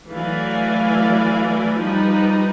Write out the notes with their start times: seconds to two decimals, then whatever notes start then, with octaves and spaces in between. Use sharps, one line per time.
0.10 E3 F#3 A3 D5 F5 G#5
1.77 F3 G3 D#4 B4